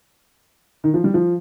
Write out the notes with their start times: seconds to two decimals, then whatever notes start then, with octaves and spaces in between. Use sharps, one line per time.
0.84 D#3
0.94 F3
1.04 G3
1.14 F3